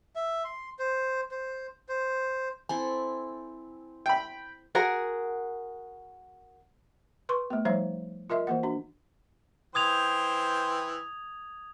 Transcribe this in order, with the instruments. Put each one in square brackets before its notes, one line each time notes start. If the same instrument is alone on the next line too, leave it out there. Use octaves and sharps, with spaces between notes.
[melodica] E5
C6
C5
C5
C5
[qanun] C4 E4 A4 [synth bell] G#5
[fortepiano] G5 B5
[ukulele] F#4 G#4 A#4 F#5
[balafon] B4 C6 C#6
A3 B3
F3 G3 D#4 C#5 E5 F5
F4 A#4 D#5 E5
E3 A#3 F#5
D4 F#4
[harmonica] E3 C5 G5 [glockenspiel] D#6 G#6 F7